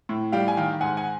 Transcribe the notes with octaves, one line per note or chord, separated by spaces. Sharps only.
A2
G3 F5 G5
G#5
D#3 F5 G5
G#2 F#5 G#5
F#5 G#5